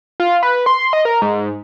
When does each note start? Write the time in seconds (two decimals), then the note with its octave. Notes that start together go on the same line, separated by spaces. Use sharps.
0.20 F4
0.43 B4
0.66 C6
0.93 D#5
1.05 A#4
1.22 G#2